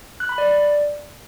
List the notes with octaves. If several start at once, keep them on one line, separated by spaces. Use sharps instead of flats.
F#6
B5
D5